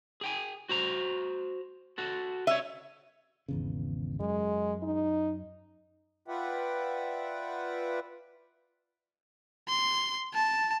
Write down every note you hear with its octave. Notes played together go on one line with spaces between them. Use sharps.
G#4 G5 G#5
F#4 C5 A#5
F#4 A4
C#5 D#5 E5
G#1 E2 C#3
F#2 G#3
D#4
F4 B4 D5 E5 F#5 G5
C6
A5